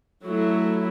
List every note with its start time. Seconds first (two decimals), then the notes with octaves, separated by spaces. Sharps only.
0.23 F#3 A3 E4